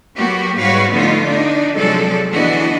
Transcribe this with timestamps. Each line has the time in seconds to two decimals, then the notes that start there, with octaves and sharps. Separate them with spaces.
0.16 F#3 A#3 B3 F#4 G4
0.57 G#2 G3 F#4 B4 C#5 F5
0.92 D3 F3 A3 B3 D#4 F4
1.28 D4 D#4
1.76 C3 F3 F#3 G#3 A4 D5
2.32 D3 E3 B3 D4 F#4 D#5